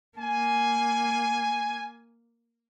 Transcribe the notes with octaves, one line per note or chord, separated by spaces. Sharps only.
A#3 G#5